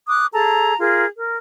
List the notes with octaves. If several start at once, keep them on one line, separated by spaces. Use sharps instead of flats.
D6 D#6 F#6
G#4 A4 A5 A#5
F4 G#4 A#4
A#4